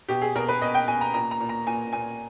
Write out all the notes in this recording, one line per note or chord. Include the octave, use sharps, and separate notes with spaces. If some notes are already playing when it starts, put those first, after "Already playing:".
B2 G4
G#4
B2 A#4
B4
B2 D#5
G5
B2 G#5
A#5
A#2 A#5
A#5
A#2
A#5
A#2 G#5
A#2 G#5